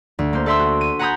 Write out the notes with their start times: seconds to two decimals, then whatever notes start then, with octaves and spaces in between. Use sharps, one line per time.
0.19 D2
0.33 A#3 C5
0.46 A4 D5 E5 C6 E6
0.59 F#4
0.81 D#7
0.99 F#5 G#5 A#5 B5 D#6 G6